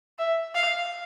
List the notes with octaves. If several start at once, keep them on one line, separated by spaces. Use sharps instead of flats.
E5
F5